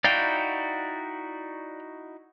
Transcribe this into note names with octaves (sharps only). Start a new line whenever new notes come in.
D#4 E4 F#4 D5 F5 G5